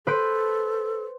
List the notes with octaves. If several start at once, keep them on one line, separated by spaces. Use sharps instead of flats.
A4 B4 C5 D7